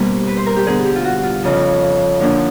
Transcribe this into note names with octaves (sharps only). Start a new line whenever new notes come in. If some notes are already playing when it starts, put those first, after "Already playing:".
Already playing: B2 G3 A#3 D4 C5
B4
C5
A#4
G4
D3 G3 B3 G#4
G4
F4
F#4
F4
F2 C#3 F3
D3 F3 A#3 D4 E4
D#4